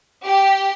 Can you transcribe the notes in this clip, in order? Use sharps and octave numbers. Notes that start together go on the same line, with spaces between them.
G4